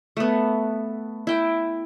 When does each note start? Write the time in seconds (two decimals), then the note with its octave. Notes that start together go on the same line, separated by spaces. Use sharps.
0.17 A3 B3
1.27 E4 G5